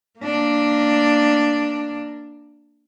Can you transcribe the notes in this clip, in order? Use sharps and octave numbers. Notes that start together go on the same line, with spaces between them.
A#3 D4